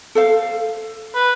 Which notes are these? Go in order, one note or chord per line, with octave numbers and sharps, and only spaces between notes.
A4 C5 F5
B4